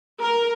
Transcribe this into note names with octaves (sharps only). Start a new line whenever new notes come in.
A#4